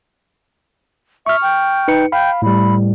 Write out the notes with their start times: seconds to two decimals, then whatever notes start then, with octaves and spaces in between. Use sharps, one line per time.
1.26 E5 C#6 F6
1.42 G5
1.88 D#4 B4 C#7
2.12 F5 G5 B5
2.42 A2 G3 B5